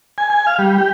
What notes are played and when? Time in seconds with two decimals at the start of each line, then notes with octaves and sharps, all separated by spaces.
0.18 G#5
0.30 G#5
0.47 F5
0.59 G3
0.78 G4